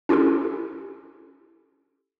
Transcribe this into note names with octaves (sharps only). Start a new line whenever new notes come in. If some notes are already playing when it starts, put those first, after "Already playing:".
C#4 E4 F4 G4 A4